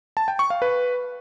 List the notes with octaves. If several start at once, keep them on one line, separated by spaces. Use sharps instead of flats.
A5
G5
C#6
F5
B4